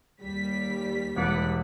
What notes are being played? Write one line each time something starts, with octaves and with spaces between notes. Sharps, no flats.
D#2 G3 B6
E1 B4 D5 F#5